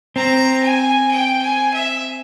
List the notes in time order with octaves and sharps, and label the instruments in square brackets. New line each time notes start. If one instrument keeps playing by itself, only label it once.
[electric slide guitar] C4 [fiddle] A#5
[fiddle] G#5
G5
G#5
E5